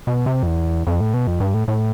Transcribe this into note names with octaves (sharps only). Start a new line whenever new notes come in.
B2
C3
F2
E2
F2
A2
B2
F2
G2
A2
A2